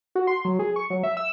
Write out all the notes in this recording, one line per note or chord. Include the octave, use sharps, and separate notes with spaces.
F#4
C6
F#3
G#4
C#6
F#3
E5
E6